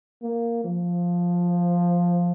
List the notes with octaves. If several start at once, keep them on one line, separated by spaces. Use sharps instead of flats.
A#3
F3